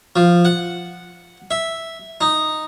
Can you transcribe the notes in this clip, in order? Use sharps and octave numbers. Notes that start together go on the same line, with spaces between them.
F3
F#5
E5
D#4